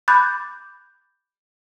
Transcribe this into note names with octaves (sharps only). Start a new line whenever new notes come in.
B5 D6 F#6 G6 A6